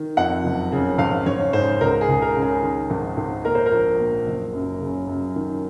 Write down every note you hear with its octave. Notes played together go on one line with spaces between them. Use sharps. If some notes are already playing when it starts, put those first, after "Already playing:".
Already playing: D#3
F2 F#5
F#1
C#3
G#1 F5
G#1 C#5
G#2 C5
C#2 A#4
G#4
C#2
A#4
C#3
G#4
D#3
G#1
G#1
A#2 A#4
C5
A#4
A#1
A#2
F#1
F#2
C#3
F#2
D#3